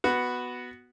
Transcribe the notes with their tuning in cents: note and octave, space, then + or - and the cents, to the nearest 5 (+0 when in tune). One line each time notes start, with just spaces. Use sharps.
B3 +0 F#4 +0